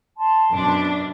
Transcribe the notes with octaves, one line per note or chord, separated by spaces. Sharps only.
A5 C6
F#2 B2 D4